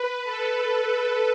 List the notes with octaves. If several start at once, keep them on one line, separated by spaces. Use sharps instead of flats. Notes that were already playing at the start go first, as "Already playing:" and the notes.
Already playing: B4
A4